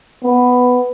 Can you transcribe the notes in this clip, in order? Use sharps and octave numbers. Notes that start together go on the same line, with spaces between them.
B3